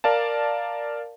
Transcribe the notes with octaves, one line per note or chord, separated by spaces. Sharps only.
A#4 D5 F5 A5